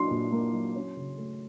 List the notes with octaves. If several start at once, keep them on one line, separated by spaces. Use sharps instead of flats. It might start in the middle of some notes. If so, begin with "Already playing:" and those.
Already playing: A#2 F#3 A#3 D4 C6
A#2
A#3
F#3
C#4
C#3
A3